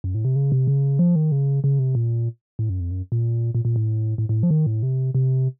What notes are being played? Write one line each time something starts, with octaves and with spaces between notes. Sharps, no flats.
F#2
A2
C3
C#3
C3
C#3
F3
D#3
C#3
C#3
C3
A#2
A2
F#2
F2
F#2
A#2
A#2
A#2
A2
A2
A2
F3
D#3
A2
C3
C3